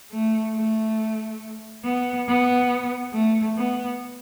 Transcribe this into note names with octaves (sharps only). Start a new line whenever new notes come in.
A3
A3
B3
B3
A3
B3